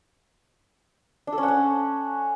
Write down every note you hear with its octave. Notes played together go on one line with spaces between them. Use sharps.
D4
A4
C#4
F#5
C#4